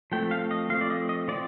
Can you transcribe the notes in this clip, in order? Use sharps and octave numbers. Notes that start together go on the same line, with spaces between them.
F3 A3 C4 G5
F5
D#5
F3 A3 C4 F5
D5
D#5
D#5
F3 C4 D5